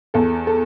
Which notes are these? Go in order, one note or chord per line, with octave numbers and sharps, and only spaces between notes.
E2 A4
A4